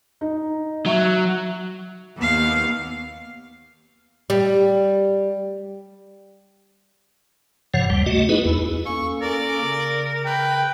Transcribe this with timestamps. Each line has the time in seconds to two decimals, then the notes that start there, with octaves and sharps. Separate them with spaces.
0.21 D#4
0.86 F#3 E5 C#6
2.18 D#2 B3 F5
4.30 G3
7.74 G2 C3 F3 C#5 F#5
7.90 D2 G3
8.06 A3 F#4 D#5
8.29 B3 D#4 E4 G#4 B4
8.45 E2 E4
8.86 A#3 C#4 A4 C#6
9.22 A#4 D5
9.61 C#3
10.26 B4 G5